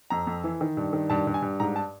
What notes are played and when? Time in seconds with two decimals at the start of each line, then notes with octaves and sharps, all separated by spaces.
0.10 F2 A#5
0.27 F2
0.44 E3
0.61 D#3
0.77 G2
0.93 D#3
1.10 G2 A5
1.27 G2
1.34 G#5
1.42 G2
1.60 G#2 A#5
1.76 A5